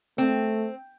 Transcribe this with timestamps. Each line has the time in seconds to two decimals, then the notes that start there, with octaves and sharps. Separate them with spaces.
0.18 A3 C4